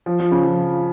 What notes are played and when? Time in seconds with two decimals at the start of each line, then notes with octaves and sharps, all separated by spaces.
0.06 F3
0.20 F3
0.31 C#3
0.44 F3